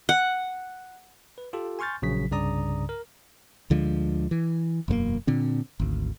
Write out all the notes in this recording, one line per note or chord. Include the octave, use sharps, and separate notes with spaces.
F#5
B4
F4 G4 A4
G#5 C6 C#6 F6 G6 A6
A#1 C#3 F#3 B6
C2 G2 C#3 D5 A#5 D#6
A#4
D2 D3 F3 G#3
E3
E1 F#2 A3 A#3
A#2 D3 C4
G#1 D2